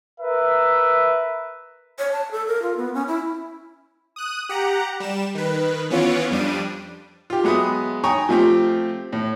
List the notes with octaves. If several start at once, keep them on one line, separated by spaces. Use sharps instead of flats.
A#4 B4 E5
C#5
A5
A4
A#4
F4
B3
C#4
E4
D#6 F#6 D#7
G4 F#5 A#5
G3 E7
D#3 B4
E3 B3 C#4 F4 C#5 D7
F2 G3 D4 D#7
F4 G4
F#3 G#3 B3 E5 D#6
C#5 G5 G#5 A#5 C#6 D#6
F3 A3 C4 F4 G4
A2